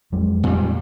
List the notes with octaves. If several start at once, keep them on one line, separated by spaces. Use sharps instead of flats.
F2 F#3 G#3
A#2 G3